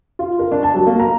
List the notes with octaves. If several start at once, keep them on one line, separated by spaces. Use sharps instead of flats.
F4
A#4
D4
A5
F#3
A#3
A#5